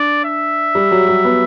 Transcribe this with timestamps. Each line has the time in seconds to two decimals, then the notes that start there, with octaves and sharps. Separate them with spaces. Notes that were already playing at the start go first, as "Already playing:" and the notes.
Already playing: D4 D5
0.25 E5
0.75 G3
0.91 F#3
1.08 G3
1.25 B3